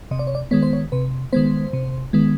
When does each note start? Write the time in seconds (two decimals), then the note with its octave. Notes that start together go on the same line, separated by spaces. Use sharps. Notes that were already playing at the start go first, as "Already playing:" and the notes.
0.11 C3 D#5
0.19 D5
0.27 C#5
0.35 D5
0.51 D#3 G#3 B3 C#5
0.63 C5
0.73 C#5
0.92 C3 B4
1.33 D#3 G#3 B3 C5
1.73 C3
2.13 D#3 G#3 B3